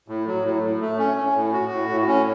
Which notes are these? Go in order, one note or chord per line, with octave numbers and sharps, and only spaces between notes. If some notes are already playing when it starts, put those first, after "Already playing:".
A2
F#3
A2
A2
A3
C#4
C#4
A2
F#4
A2
A2
C#4